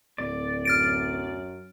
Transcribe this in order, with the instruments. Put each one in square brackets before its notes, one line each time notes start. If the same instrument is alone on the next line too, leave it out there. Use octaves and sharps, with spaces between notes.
[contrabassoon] D1 [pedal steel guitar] D5
[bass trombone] F#2 [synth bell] F6 A6 D7